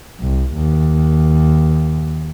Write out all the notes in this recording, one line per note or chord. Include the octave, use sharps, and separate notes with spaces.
C2
D#2